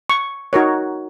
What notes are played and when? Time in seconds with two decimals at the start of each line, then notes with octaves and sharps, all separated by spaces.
0.09 C#6
0.53 D#4 F#4 A#4 C#5